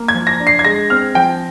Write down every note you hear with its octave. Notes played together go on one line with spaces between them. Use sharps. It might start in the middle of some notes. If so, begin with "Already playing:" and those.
Already playing: A#3
G#6
F3
A#6
D4
C7
G#6
G#3 A#6
C4 F6
F3 G5